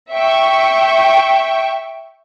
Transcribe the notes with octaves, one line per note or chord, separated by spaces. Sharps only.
E5 G5 C#6